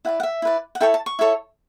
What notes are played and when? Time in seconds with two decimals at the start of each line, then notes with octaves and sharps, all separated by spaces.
0.05 E4 B4 D5 F#5
0.20 F#5
0.23 E5
0.42 E4 B4 D5
0.75 F#5
0.80 E4 A4 C#5 G5
0.94 A5
1.06 C#6
1.19 E4 A4 C#5